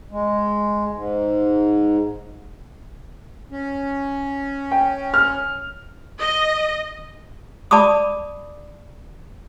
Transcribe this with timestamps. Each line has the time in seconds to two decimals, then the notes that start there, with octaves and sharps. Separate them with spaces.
0.11 G#3
0.93 G#2
3.51 C#4
4.71 G5
5.14 F6
6.20 D#5
7.71 D5 A5 B5 D6 D#6